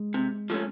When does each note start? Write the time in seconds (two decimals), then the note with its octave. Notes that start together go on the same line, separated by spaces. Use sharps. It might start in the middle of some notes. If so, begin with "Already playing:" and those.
Already playing: G#3
0.14 C3
0.50 F3 A3 C#4